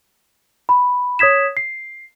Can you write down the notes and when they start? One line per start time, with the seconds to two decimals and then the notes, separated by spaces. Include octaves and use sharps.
0.69 B5
1.19 C#5 D#6 G#6 B6 E7
1.57 C7